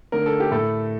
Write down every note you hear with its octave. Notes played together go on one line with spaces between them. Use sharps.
D3 A3 A#4
A4
G4
A2 A3 A4